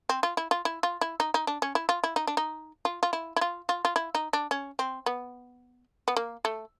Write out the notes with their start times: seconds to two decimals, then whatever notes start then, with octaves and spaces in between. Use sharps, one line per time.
0.09 C4
0.23 F4
0.37 E4
0.51 F4
0.65 E4
0.83 F4
1.01 E4
1.20 D#4
1.34 D#4
1.47 D4
1.62 C#4
1.75 E4
1.89 F4
2.04 E4
2.16 D#4
2.27 D4
2.37 D#4
2.85 F4
3.03 F4
3.13 E4
3.36 E4
3.41 F4
3.69 F4
3.85 F4
3.96 E4
4.15 D#4
4.33 D4
4.51 C#4
4.79 C4
5.06 B3
6.08 B3
6.16 A#3
6.45 A3